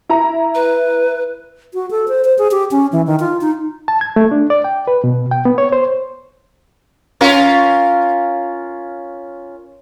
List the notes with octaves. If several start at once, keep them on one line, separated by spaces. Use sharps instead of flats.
E4 A#5
B4
F#4
A4
C5
C5
G#4
G4
C#4
E3
D#3
F4
D#4
A5
G#6
A3
D4
D5
G5
B4
B2
G5
B3
C#5
C5
C#4 F4 A#4